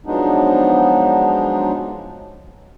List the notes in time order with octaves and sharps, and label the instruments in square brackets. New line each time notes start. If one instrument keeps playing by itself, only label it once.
[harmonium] F3 F#3 G#3 B3 D4 D#4